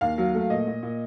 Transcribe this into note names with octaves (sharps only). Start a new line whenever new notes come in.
D#2 F5
F#3
A3
A#2 D#5
A#2
A#2